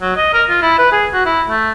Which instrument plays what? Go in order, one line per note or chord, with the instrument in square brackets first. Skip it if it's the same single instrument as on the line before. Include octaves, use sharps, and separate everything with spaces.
[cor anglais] F#3
D#5
A#4
F4
E4
B4
G#4
F#4
E4
A3